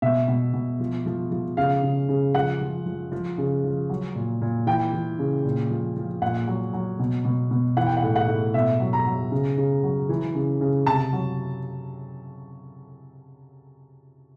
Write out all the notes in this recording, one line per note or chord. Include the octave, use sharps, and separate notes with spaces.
B2 E5
B2
B2
F3
F3
F3
C#3 F5
C#3
C#3
F3 F#5
F3
F3
F3
C#3
F3
F#3
A#2
A#2
E3 G5
E3
C#3
A#2
F3
F3
A#2 F#5
F#3
F#3
B2
B2
B2
E3 F#5
G5
F#5
A2
F#5
A2
B2 E5
F#3
A#5
F#3
C#3
C#3
F#3
E3
C#3
C#3
C3 A5
F#3